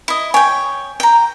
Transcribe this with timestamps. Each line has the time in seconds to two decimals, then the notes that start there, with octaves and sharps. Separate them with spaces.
0.08 E4 D#5
0.34 C#5 G5 G#5
1.00 G5 A#5